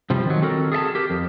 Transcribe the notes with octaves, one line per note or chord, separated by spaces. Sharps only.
C3 F3 G3
D#3 F#3
C4 F#4 A4 A#4
G#4 A4 E5 A5
G4 A#4
F2